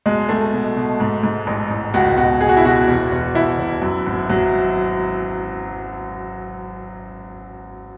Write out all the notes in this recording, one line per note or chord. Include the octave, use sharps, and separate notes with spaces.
B1 G#3
B1 A3
B2
B2
G#2
G#2
A1
A1
C#2 F#4
B2 F#4
B2 G#4
F#4
E4
B2 F#4
E1
E1
E1 E4
E1
F#2
G#1
G#1 F#3